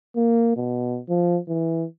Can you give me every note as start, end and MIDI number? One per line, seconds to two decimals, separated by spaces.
0.16 0.53 58
0.56 0.99 47
1.09 1.38 53
1.48 1.84 52